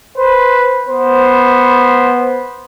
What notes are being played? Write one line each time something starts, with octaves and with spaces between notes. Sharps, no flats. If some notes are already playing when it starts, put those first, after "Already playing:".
B4 C5
B3 C5